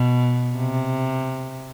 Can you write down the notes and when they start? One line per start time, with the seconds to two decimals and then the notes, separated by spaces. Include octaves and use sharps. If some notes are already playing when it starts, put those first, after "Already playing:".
Already playing: B2
0.57 C3